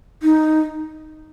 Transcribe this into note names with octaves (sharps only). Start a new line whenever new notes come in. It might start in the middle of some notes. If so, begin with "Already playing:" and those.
D#4